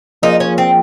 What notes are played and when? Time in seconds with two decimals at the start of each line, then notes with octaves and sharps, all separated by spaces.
0.23 F3 A#3 D#4 F4 G#4
0.40 C#4
0.58 C4